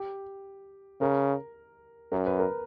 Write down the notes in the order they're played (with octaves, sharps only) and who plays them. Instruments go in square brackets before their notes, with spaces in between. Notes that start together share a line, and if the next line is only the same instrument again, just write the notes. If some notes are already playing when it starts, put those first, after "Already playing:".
Already playing: [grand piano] G4
[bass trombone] C#3 [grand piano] A#4
[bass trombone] F#2 [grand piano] A#4
[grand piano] B4
A#4